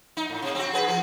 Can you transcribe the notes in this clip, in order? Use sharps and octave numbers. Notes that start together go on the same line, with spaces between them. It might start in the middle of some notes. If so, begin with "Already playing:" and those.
D#4
A2
C3
C4 F#4
G#4 B4
F3